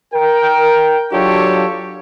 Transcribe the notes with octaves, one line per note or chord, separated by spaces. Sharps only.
A#4 G5
F#3 D4 F4 G4 A4 C#5